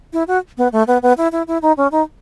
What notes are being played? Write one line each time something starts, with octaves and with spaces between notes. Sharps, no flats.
E4
F#4
B3
A3
B3
B3
E4
E4
E4
D#4
C#4
D#4